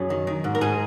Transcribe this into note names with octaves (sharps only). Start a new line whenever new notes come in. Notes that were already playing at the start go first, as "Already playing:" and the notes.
Already playing: F#2 G#4
D#3
D#3
G#2
A#4
G#2 G#4